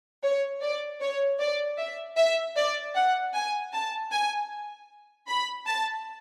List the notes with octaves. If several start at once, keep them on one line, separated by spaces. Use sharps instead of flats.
C#5
D5
C#5
D5
E5
E5
D5
F#5
G#5
A5
G#5
B5
A5